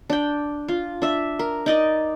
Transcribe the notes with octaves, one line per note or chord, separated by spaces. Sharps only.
D4 G5
F4
D4 E5
A#4
D#4 D5 D#5